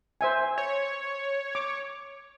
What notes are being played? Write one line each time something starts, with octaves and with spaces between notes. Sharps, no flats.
C5 E5 G#5
C#5
D6